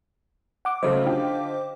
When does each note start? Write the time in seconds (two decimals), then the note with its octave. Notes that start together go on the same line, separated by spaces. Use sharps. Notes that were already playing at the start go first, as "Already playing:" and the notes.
0.65 F#5 D6
0.83 C#3 F#3 A3 C5 D#5 D6
1.05 D3 F4 G4